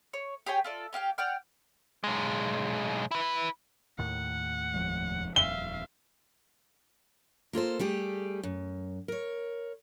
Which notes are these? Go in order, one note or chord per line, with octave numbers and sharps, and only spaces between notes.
C#5
G4 G#4 C#5 G5
F4 A4 D5
C#4 G4 F5 G5
D5 F#5 G5 F6
B1 G#3
E4 B4
D#2 A2 D#3 F#5
F1 F3 G#3
D#1 F2 E5 F5 G7
A#3 F4 A4 C5
G3 A3 G4 G#4
F#2
A#4 C#5